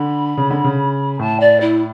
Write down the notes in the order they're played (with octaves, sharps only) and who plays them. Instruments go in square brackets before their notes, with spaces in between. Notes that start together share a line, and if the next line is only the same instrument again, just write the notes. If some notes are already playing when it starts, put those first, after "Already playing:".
Already playing: [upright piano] D3 [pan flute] B5
[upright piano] C#3
D3
C#3
[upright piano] A2 [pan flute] A5
[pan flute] D5
E4